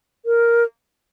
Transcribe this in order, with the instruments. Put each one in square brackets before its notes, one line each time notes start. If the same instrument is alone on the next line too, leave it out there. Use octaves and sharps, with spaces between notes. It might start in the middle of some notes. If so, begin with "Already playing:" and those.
[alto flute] A#4